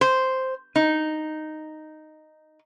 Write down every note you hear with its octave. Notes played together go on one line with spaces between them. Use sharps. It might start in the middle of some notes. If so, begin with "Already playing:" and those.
C5
D#4